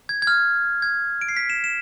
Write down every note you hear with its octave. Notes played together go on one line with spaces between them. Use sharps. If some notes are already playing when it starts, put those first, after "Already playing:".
G#6
G#6
F6
G#6
D7
C7
B6
E7
E7